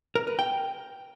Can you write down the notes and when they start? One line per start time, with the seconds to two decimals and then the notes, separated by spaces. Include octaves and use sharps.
0.15 A#4
0.27 B4
0.39 G5